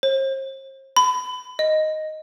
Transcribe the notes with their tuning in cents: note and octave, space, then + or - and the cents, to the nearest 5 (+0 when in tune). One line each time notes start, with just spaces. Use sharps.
C5 +40
B5 +30
D#5 +0